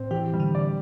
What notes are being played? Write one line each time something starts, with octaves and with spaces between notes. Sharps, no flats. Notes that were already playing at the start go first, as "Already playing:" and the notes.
Already playing: A2 C4
E3 G4
G3
D3
D5